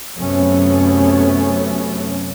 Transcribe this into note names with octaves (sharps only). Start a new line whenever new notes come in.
F#2 C3 F#3 A3 B3 C#4